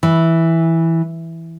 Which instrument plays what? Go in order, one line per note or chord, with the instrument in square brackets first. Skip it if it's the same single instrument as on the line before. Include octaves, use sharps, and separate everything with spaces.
[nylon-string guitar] E3